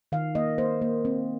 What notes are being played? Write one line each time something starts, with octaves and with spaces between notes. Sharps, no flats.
D#3 F5
A#3 D#5
A#3 C5
A#3
C4